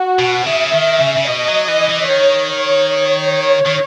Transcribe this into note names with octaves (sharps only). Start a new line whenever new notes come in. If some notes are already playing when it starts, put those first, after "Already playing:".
Already playing: F#4
B2
C#3 E5
D#3
C#3
C#3
B2 D#5
F#3
E3
E3
D#3 C#5
D#3